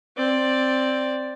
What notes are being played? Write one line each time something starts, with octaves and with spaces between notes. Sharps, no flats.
C4 D5